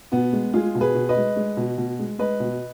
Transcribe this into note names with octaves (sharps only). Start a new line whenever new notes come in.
B2 B3
G#3
G#3 F4 G#4
B2
G#4 B4
B2
B4 D#5
G#3
G#3
B2
B2
G#3
G#3 B4 D#5
B2